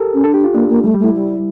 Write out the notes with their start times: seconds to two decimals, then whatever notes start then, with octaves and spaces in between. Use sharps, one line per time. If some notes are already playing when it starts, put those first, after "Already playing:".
Already playing: G4 A4 A#4
0.14 C#4
0.24 D4 A4
0.34 G4
0.44 F4
0.54 A#3 D4
0.69 A#3
0.84 G3 A3
0.94 G3
0.99 A3 E4
1.14 G3